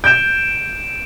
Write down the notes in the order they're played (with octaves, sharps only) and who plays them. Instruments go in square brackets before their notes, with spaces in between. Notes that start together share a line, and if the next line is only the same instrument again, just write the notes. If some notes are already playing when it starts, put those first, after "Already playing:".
[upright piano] G6 [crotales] D7 E7